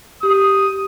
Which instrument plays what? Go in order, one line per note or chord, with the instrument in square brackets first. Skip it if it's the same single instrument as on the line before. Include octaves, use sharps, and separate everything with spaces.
[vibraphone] G4 [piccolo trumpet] D#6